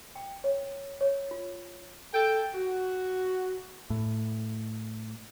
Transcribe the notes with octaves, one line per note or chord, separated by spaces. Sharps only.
G5
C#5
C#5
F4
A4 G5
F#4
A2